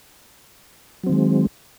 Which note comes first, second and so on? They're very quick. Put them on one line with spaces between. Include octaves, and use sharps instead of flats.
F#3 C4 D#3 G#3